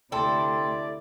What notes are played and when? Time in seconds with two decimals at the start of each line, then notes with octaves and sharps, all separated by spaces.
0.12 D2 C3 E4 A4 D5 G5 A5 C6